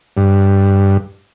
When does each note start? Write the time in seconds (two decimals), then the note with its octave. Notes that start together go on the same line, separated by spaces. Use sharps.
0.17 G2